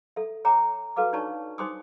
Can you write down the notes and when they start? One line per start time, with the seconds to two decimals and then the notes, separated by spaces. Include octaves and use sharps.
0.16 A4 E5
0.45 C#5 G5 A#5 D6
0.96 F#4 A4 B4 F5 D6
1.13 D4 D#4 C#5 D5 A5 C#6
1.58 D#4 C5 G#5 C6 D6 D#6